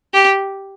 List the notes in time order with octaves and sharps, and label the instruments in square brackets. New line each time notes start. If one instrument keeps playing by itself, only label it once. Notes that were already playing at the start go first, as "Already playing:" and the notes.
[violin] G4